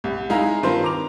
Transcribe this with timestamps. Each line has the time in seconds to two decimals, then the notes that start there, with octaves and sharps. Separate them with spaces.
0.04 C2
0.30 G#3 D#4 E4 F5 A#5
0.63 G2 D#3 C4 F4 B4 C6
0.83 A#5 D6 F7